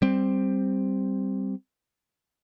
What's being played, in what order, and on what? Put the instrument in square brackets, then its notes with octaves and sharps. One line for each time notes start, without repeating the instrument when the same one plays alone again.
[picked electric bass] G3 C4